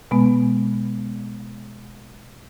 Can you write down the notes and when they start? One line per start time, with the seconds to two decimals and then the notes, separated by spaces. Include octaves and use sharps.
0.11 B2 G#3 B3